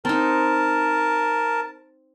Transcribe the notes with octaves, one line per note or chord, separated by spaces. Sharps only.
C4 D#4 A#4 A5